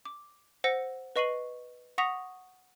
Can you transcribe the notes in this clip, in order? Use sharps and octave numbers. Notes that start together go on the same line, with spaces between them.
D6
C5 F#5 E6 A#6 C#7
B4 D#5 C#6 C7 D#7 F#7
F#5 C#6 D#6 A#6 B6 F7